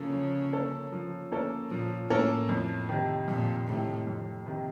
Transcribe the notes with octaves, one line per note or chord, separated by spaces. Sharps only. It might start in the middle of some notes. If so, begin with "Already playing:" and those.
Already playing: C#3 F3 A#3 C#4 A4
F3
A#3 C#4 A4
F3
A#3 C#4 A4
A#2 F3
A2 A#3 C#4 A4
F2 A2
C3 D#3
F2 A#2
A2 C3 D#3
F2
C3 D#3